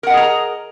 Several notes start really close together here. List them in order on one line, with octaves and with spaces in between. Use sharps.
A#4 F#5 D#5 G#4 A#5